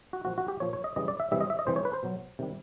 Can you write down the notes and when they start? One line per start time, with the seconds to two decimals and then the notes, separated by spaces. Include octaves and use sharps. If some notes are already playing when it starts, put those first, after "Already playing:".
0.13 F#4
0.25 A#2 F3 F#4
0.38 F#4
0.48 G4
0.60 A#2 F3 C#5
0.73 C#5
0.84 D#5
0.96 C#3 E3 G3 D#5
1.08 D5
1.20 E5
1.31 C3 E3 G3 E5
1.41 D#5
1.50 E5
1.59 D#5
1.67 C3 E3 G3 C5
1.76 C#5
1.85 B4
1.93 C5
2.03 B2 F#3
2.39 C3 D#3 G3